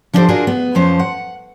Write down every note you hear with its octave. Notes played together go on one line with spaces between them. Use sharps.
F3 D4 E4 G4 A4 C5
D4 F4 F#4 G#4 A#4
B3
F2 F3 C#4 C5
F#5